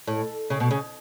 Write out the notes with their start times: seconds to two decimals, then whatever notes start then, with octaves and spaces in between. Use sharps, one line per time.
0.07 A2
0.50 C#3
0.60 B2
0.71 C#3